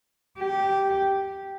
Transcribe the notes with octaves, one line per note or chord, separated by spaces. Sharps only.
G4